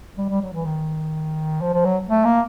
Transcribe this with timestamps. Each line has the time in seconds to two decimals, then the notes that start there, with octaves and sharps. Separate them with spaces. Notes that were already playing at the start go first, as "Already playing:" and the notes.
0.18 G3
0.29 G3
0.41 F#3
0.53 E3
0.65 D#3
1.61 F3
1.73 F3
1.85 F#3
2.09 A3
2.25 A#3